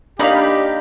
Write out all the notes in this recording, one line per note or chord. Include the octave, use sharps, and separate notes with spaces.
A#3 D4 D#4 G4 D5 F5 B5